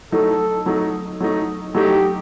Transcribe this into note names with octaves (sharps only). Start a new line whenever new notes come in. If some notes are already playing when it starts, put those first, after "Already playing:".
F#3 A3 D#4 A4
F#3 A3 D#4
F#3 A3 D#4
F#3 A3 D#4 G4